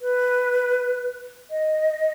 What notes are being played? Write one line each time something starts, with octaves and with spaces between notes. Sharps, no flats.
B4
D#5